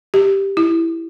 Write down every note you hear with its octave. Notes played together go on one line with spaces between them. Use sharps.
G4
E4